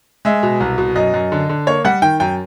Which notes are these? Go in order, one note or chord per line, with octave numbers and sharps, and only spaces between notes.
G#3 E5
B2
C2
B2
F#2 D#5
F#2
D3
D3
A#3 C#5
G3 F#5
D#3 G5
F#2 G5